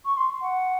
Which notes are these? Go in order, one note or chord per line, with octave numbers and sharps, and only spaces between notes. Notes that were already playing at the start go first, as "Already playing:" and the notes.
C#6
C6
F#5